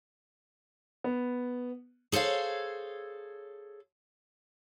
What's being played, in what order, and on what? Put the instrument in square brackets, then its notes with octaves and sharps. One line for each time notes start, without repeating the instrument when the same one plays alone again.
[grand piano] B3
[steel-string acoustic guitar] G#4 A4 C5 C#5 F5